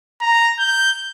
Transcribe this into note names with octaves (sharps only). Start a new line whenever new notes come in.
A#5
G6